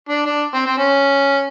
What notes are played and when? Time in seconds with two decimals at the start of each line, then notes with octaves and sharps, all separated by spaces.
0.09 D4
0.26 D4
0.54 C4
0.66 C4
0.78 C#4